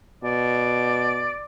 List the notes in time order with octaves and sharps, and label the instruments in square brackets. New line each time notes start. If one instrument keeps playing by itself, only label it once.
[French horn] B2 [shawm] D5